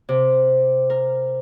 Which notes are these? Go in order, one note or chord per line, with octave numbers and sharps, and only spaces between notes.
C3
A#4